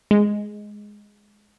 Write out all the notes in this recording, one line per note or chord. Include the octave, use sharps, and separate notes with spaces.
G#3